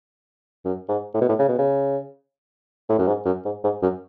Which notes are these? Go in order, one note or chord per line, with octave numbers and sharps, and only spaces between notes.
F#2
G#2
A2
B2
A2
C#3
B2
C#3
A2
F#2
G#2
F#2
G#2
G#2
F#2